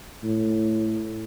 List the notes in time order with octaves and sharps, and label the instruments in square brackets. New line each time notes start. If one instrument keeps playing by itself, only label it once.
[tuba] A2